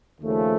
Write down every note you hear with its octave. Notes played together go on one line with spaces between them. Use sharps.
D#2 C#3 F3 A3